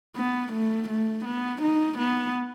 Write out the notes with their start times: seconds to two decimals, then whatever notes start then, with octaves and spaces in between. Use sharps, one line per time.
0.16 B3
0.53 A3
0.89 A3
1.25 B3
1.62 D#4
1.98 B3